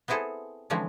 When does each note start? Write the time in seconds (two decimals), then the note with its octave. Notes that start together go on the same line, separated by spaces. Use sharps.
0.08 B3 C4 E4 G#4 A4 C5
0.70 D3 E3 F3 G#3 C4 C#4